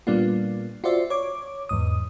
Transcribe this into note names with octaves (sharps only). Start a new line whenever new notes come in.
A#2 G3 A#3 B3 D4 F4
F4 F#4 C5 D5 E5
C#5 D6
E2 G#2 D#6